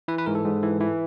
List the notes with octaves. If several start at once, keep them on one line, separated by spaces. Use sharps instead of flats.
E3 B4
B4
G#2 A#4
A4
G#2
E3
E3